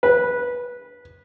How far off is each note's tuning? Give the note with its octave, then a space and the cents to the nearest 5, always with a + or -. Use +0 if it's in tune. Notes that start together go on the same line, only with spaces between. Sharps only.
B4 -15